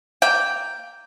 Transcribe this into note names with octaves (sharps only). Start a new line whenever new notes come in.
A#3 G5